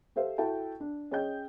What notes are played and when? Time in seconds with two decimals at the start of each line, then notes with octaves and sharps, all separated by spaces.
0.16 G4 A4 C5 E5 F5
0.38 E4 F#4 A4 E5 G5 A5
0.80 D4
1.11 C#4 G#4 D#5 G5 G6